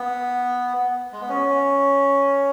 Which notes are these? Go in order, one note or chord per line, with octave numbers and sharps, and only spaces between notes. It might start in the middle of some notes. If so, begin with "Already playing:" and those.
Already playing: B3
G#3
B3
C#4